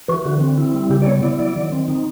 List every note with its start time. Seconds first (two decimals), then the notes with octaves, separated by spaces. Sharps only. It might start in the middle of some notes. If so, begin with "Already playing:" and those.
0.08 E3 F#4
0.25 D3 F#4
0.41 C4
0.58 E4
0.74 G3
0.90 C#3 G4
1.02 D5
1.06 B3 C#5
1.23 E4 D5
1.39 F#3 D5
1.56 D#3
1.72 C4
1.88 D#4